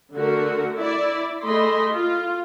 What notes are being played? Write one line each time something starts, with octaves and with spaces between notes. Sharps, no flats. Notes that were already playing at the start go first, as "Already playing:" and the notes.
D3 A3 F#4 A#4
E4 D5
A3 G#4 D#5 B5 C6
F4